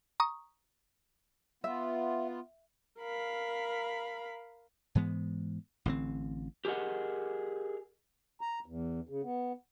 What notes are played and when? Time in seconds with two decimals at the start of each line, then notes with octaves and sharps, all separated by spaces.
0.20 A#5 C#6 D#6
1.64 B3 F4 E5
3.00 A#4 F5 B5
4.95 G#2 E3 G#3 B3
5.86 A1 D3 F#3 C4
6.65 G4 G#4 A#4 D#5 F#5
8.41 A#5
8.66 E2
9.09 C#3
9.23 B3